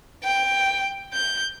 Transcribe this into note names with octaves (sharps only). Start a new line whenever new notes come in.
G5
G6